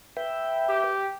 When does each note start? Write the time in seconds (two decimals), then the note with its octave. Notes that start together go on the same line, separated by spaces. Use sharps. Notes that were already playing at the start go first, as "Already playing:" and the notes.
0.17 B4 E5 G5
0.69 G4